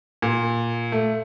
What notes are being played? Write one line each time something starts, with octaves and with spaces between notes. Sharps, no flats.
A#2
A3